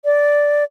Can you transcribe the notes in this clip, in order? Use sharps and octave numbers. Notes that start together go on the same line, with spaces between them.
D5